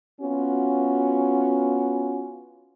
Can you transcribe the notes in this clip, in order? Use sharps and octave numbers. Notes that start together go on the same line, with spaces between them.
B3 C#4 F4 F#4